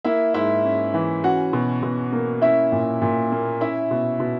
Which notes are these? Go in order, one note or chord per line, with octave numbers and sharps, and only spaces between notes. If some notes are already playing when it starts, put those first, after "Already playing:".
A#3 E4 E5
G#2 E4 E5
C#4
E3
C#4 F#4 F#5
B2
B2
A#3
C#4 E4 E5
A#2
A#2
A#3
C#4 E4 E5
B2
B2